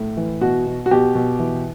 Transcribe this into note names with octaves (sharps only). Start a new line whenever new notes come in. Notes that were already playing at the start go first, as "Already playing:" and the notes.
Already playing: A2
E3
B2 F#4
B2
F#4
B2 G4
B2
E3